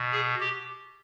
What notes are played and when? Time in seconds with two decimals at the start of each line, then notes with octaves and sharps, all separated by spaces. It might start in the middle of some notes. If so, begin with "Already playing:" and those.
Already playing: B2
0.12 G#4
0.40 G4